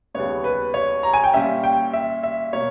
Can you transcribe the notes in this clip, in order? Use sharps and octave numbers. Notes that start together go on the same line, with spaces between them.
D#2 C#3 G3 B3 C#5
B4
C#5
A#5
G#5
G5
A#2 G3 C#4 E5
G5
E5
E5
B2 A#3 C#5